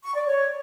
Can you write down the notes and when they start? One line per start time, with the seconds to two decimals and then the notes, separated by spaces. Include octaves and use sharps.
0.03 C#6
0.15 D5
0.26 C#5